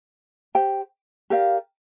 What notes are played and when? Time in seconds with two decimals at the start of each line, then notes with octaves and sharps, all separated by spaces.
0.55 G4 C5 G5
1.30 G4 A#4 D5 F5